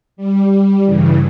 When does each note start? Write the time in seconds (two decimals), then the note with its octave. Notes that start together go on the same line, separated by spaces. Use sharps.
0.17 G3
0.85 G2 C#3 E3